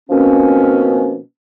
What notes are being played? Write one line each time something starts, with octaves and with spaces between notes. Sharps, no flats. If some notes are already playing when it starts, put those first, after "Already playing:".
B2 D#3 F3 A#3 C4 C#4